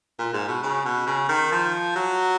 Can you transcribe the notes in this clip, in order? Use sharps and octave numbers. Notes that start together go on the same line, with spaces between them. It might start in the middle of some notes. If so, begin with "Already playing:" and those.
A#2
G#2
B2
C#3
B2
C#3
D#3
F3
F#3